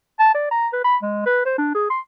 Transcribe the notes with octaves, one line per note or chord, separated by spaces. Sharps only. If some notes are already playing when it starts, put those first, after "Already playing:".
A5
D5
A#5
B4
B5
G#3
B4
C5
D4
G#4
C6